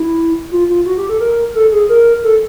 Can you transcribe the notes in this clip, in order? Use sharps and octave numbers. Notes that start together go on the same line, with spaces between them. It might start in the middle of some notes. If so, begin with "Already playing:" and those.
Already playing: E4
F4
F4
F#4
G4
A4
A#4
A4
G#4
A#4
A4